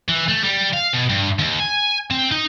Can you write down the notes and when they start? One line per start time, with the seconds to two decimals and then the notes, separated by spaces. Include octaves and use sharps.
0.09 E3
0.28 A3
0.44 G3
0.73 F5
0.93 B2
1.09 G2
1.39 D#2
1.60 G#5
2.11 C4
2.32 D#4